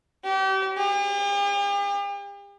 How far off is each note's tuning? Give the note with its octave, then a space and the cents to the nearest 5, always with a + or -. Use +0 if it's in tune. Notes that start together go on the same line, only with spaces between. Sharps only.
G4 -35
G4 +45